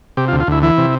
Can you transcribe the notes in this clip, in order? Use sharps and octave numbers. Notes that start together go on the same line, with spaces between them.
C3 G4
F4
D2
F4
D2 E4
E3 E4
C3